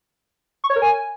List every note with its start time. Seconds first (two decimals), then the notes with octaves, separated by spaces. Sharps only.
0.64 C#6
0.70 C#5
0.76 A#4
0.82 G#5